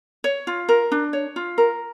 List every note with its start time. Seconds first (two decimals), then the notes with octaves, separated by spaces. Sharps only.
0.24 C#5
0.47 F4
0.69 A#4
0.92 D4
1.13 C#5
1.36 F4
1.58 A#4